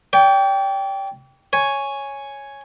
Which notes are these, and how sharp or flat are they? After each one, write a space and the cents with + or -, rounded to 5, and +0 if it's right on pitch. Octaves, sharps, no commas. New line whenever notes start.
D5 -45 G5 +0
C#5 +0 G#5 +0